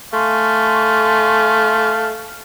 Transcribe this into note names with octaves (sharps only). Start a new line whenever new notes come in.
A3 F5 G#5 C6 C#6